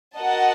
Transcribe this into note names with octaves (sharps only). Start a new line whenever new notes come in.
F#4 A#4 D#5 F#5 A5